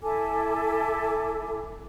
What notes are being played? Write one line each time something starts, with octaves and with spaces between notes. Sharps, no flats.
E4 A4 G#5 D6